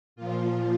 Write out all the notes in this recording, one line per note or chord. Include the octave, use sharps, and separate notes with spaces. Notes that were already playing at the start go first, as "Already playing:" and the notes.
A#2 F3 F4